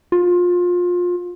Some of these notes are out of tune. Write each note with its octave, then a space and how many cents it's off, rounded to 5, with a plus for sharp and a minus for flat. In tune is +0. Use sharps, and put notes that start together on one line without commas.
F4 +25